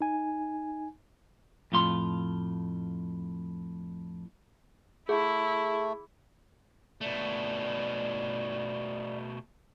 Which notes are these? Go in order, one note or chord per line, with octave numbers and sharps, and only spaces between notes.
D#4 G#5
F2 A2 F4 C6
A3 E4 G#4
B2 A3 D5